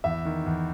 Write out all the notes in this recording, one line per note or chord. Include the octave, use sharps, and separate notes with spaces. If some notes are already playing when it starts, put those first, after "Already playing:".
E2 E5
D#3
E2